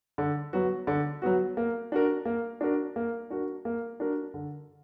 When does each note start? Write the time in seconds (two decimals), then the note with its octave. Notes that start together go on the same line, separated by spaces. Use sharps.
0.18 D3
0.53 F#3 B3 F#4
0.87 D3
1.22 F#3 B3 F#4
1.57 A#3
1.92 D4 F#4 A#4
2.25 A#3
2.61 D4 F#4 A#4
2.96 A#3
3.30 D4 F#4 A#4
3.65 A#3
4.00 D4 F#4 A#4
4.34 D3